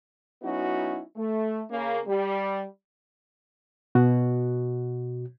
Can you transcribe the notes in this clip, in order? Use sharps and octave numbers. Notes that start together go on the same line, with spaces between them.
F#3 B3 C#4 D#4 E4 F#4
A3
C#3 A#3
G3
B2 F#4